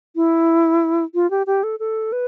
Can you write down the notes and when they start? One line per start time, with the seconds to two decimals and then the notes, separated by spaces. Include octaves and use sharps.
0.16 E4
1.15 F4
1.31 G4
1.47 G4
1.63 A4
1.80 A4
2.12 B4